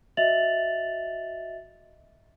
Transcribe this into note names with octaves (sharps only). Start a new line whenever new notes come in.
F#4 D#5 E5 A6 F7 F#7